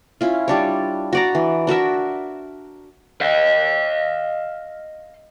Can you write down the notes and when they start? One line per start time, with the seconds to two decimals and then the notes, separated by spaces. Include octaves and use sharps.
0.21 C#4 E4 F4
0.48 G3 D4 C#5
1.13 F#4 D5 A#5
1.35 E3
1.67 D4 F#4 A#4 E5
3.21 D#5 F5